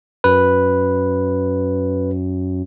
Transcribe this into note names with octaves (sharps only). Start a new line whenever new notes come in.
F#2 B4